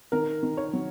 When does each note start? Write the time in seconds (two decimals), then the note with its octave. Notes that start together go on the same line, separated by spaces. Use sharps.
0.12 D#3 A#4
0.43 D#3
0.57 C#5
0.73 F#3